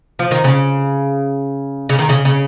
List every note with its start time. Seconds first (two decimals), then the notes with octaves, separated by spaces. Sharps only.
0.19 F3
0.31 D#3
0.44 C#3
1.89 C#3
1.99 D#3
2.09 C#3
2.25 C#3